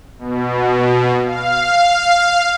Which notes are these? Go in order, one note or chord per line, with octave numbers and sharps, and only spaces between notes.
B2
F5